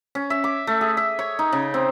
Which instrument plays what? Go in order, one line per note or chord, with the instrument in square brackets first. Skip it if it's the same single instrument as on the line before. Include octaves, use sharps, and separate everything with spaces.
[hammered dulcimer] C#4
E5
D6
A3
G#4
E5
C#5
D#4
C#3
C4